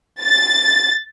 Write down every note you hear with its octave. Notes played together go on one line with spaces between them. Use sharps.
A6